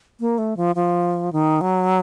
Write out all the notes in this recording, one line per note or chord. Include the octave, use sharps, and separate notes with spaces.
A#3
A3
F3
F3
D#3
F#3